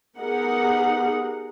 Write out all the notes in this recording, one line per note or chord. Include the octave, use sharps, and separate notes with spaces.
B3 D#4 G4 G#4 A#4 F#5